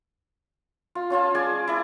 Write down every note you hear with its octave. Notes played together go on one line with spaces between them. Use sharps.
F4
C#4 F4 F5 A5
G#3 D5 G#5
E4 D5